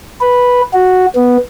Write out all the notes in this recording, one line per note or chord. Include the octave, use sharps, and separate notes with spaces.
B4
F#4
B3